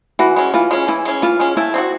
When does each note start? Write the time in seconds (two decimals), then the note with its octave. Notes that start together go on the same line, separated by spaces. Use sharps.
0.19 E3 F#4
0.36 G#3 C#4
0.54 E3 F4
0.71 G#3 C#4
0.88 E3 E4
1.05 G#3 C#4
1.22 E3 F4
1.40 G#3 C#4
1.57 A3 E4
1.74 C4 D#4
1.78 F#4